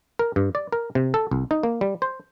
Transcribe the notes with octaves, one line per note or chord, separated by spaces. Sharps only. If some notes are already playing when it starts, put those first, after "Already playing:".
A#4
G2
D5
A#4
C3
A4
C2
D#4
A#3
G3
C5